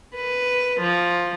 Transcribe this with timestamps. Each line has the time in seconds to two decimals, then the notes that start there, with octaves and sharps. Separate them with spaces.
0.12 B4
0.80 F3